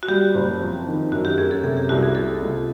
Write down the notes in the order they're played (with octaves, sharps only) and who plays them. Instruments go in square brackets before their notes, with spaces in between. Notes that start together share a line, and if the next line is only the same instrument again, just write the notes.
[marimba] F#4
[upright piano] G3 [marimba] G4
[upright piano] F#1
F2
D#3
[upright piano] F#2 [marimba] F#4
[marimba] G4
[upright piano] F#2 [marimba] G#4
[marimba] A4
[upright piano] C3 [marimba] G#4
[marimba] G4
[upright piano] C2 [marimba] F#4
[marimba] G#4
[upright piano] C3 [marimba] A4
[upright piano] C#2